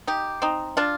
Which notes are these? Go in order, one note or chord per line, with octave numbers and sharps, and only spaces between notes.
D#4 G4
C4 D#4
D4 F4